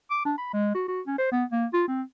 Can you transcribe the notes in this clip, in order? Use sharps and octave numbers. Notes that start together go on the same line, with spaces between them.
D6
D4
B5
G#3
F#4
F#4
C#4
C5
B3
A#3
F4
C4